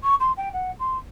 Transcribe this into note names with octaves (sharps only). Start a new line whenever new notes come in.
C#6
C6
G5
F#5
C6